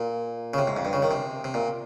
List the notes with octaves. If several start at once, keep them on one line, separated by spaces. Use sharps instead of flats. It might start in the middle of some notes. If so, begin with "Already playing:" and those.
Already playing: A#2
C#3
C3
G#2
F2
G2
C#3
D#3
C3
C3
A#2